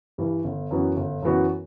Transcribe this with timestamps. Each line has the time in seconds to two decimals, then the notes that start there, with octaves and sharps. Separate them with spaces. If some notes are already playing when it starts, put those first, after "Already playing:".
0.18 G2 E3
0.44 G1
0.71 F#2 E3 B3 F#4
0.97 G1
1.22 F#2 E3 B3 F#4